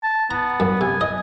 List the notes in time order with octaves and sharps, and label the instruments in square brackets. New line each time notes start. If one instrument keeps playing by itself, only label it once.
[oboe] A5
[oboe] B3 [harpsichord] A#5
[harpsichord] F#2
[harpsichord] C3 [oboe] G#5
[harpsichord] D#5